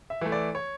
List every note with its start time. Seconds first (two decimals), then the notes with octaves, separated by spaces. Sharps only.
0.10 E5
0.22 E3 A3
0.32 D5
0.55 C#5